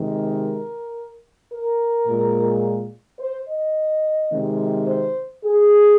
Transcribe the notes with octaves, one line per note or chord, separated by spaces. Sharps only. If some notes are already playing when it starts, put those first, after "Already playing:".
Already playing: C3 D#3 G#3
A#4
A#4
A#2 G#3
C5
D#5
C3 D#3 G#3
C5
G#4